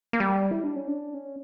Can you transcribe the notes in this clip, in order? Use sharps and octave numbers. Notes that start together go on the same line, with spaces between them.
A#3
G3
E4
D4
C#4
D4
C#4